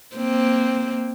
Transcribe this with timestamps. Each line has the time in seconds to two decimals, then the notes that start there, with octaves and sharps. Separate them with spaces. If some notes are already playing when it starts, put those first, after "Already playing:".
0.16 A#3 C4